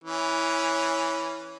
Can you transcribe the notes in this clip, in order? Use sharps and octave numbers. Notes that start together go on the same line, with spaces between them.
E3 C#4